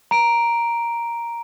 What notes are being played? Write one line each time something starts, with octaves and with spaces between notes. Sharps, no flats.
A#5 D7